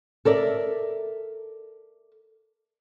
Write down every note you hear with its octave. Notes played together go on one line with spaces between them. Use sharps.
A4 A#4 D5 E5